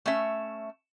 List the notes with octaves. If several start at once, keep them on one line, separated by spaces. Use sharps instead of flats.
A3 C#4 E5